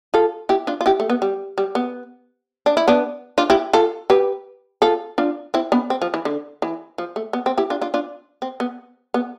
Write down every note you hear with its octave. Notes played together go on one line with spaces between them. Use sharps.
F4 A4
E4 G4
D4 F4
F4
E4 G4
A3
B3
G3
G3
B3
D4
E4
B3 D4
D4 F4
E4 G4
F4 A4
G4 B4
F4 A4
D4 F4
C4 E4
B3 D4
C4
F3
E3
D3
E3
F3
A3
B3
C4
E4 G4
D4 F4
D4 F4
D4 F4
C4
B3
B3